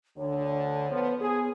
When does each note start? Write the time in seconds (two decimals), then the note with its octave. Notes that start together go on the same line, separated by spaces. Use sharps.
0.17 D2 D3 C#5
0.90 F3 B3
1.21 B3 G#4